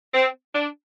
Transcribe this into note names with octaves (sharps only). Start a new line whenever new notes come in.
C4
D4